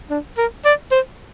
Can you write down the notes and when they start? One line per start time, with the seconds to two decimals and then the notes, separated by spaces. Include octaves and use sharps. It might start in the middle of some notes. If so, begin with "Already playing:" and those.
0.10 D4
0.37 A#4
0.65 D5
0.91 C5